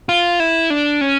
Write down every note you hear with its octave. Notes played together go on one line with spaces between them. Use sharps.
F4
E4
D4
C#4